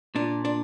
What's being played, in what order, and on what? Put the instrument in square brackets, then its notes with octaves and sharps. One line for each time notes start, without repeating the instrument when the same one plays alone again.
[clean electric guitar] A#2 [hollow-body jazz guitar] D4
[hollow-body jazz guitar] D4